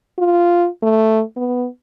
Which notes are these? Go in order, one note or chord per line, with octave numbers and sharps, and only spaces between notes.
F4
A3
B3